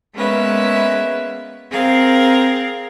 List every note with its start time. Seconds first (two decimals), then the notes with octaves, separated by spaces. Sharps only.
0.15 G#3 A#3 B3 C#4 B4 E5
1.72 C4 G#4 A#4 F5